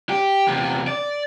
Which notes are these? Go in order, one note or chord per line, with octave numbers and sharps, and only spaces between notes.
G4
E2 C3
D5